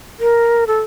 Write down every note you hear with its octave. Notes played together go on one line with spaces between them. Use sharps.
A#4
A4